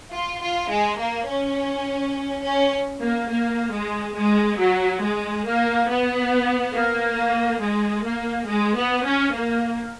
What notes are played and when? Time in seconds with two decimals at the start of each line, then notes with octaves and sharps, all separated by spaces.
0.12 F4
0.41 F4
0.70 G#3
0.98 A#3
1.27 C#4
2.43 C#4
3.01 A#3
3.29 A#3
3.72 G#3
4.16 G#3
4.59 F#3
5.02 G#3
5.46 A#3
5.89 B3
6.75 A#3
7.61 G#3
8.06 A#3
8.49 G#3
8.77 B3
9.07 C#4
9.34 A#3